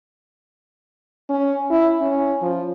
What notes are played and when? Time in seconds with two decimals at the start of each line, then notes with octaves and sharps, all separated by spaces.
1.30 C#4
1.70 E4
2.01 C#4
2.42 F3